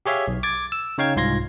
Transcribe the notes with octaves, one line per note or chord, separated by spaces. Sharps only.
G4 G#4 C#5 E5 F5
B1
D6 G#6 A6
E6
C#3 D#4 C#5 F5 G5 G#6
C2 G#2 F4 C6 G#6 A#6